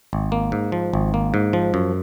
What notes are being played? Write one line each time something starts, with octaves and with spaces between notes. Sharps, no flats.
G#1
A#3
G#2
F3
G#1
A#3
G#2
F3
F#2